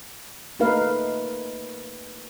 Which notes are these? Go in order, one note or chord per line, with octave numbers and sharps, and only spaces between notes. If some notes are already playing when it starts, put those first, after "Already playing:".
A3 A#3 D#4 A#4 B4 F5